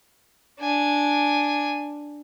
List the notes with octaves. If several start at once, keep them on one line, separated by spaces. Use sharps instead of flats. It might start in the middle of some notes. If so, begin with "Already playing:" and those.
D4 G#5